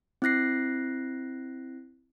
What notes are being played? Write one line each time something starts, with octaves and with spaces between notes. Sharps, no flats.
C4 E4 F#6 A#6 C7